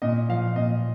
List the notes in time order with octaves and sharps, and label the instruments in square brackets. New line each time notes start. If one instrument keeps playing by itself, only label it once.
[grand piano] A#2 D#5
F3 F5
A#2 D#5